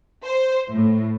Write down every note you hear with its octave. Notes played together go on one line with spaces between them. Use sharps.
C5
A2